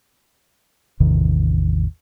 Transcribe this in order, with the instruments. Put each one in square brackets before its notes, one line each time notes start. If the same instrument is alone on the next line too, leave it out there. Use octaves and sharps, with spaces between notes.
[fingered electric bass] A1 E2 C3 D#3